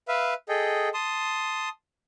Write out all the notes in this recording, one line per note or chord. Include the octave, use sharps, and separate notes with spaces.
B4 E5 F5
G#4 A4 D#5 G5
A5 C6 D#6